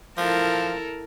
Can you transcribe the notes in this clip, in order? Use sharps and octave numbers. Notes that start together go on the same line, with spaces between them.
F3 E4 A4 A#4